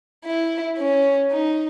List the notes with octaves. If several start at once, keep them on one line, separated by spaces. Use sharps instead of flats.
E4
C#4
D#4